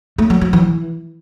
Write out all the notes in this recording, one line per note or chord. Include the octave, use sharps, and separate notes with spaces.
A3
F#3
F#3
E3